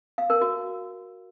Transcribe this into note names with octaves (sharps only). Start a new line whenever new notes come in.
F5
A#4
F#4